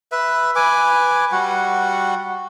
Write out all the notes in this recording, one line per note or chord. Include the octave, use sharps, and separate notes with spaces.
B4 E5
B4 G#5 D6
G3 F#4 F#5